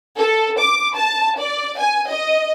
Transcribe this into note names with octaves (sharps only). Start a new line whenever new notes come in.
A4
D6
A5
D5
G#5
D#5